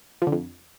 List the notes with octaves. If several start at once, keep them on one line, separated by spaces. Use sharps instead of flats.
F3
D3
F2